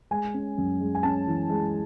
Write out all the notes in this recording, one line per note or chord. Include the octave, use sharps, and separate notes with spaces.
G#3 G#5
C#4
F#2
G#3
G#5
C#4 A5
E3
G#3